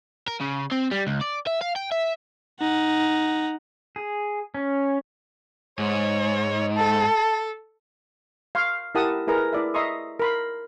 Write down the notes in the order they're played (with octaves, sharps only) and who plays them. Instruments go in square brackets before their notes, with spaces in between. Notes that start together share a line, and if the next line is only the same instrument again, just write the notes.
[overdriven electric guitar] A#4
C#3
C4
G3
C#2
D5
E5
F5
G5
E5
[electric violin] D#4 F#5
[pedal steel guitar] G#4
C#4
[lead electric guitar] G#2 [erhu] C#5
[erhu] A4 [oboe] A5
[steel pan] F5 C6 C#6
E4 G4 A#4 F#5 A5 D#6
E4 G#4 A#4 B4 A#5
E4 D5 E5
D#5 E5 A#5 C6 C#6 D#6
A#4 B5 C6